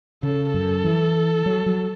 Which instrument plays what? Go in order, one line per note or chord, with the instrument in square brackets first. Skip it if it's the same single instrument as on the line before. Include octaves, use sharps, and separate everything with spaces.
[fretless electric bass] C#3 [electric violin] A4
[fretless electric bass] F#2 [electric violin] A4
[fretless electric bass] E3
F#3
F#3